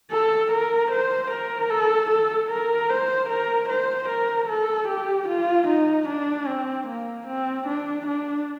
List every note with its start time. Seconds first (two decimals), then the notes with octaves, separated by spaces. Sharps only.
0.11 A4
0.52 A#4
0.91 C5
1.31 A#4
1.70 A4
2.11 A4
2.50 A#4
2.90 C5
3.29 A#4
3.69 C5
4.09 A#4
4.48 A4
4.88 G4
5.28 F4
5.68 D#4
6.08 D4
6.48 C4
6.87 A#3
7.27 C4
7.67 D4
8.06 D4